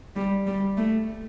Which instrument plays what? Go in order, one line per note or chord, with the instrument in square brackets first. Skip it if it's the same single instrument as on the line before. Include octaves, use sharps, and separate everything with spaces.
[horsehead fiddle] G3
G3
A3